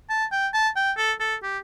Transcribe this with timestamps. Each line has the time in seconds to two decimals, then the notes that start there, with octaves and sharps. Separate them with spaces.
0.10 A5
0.32 G5
0.54 A5
0.76 G5
0.97 A4
1.20 A4
1.43 G4